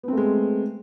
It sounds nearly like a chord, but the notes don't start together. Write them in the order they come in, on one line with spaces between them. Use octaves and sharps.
B3 C4 A3 G#3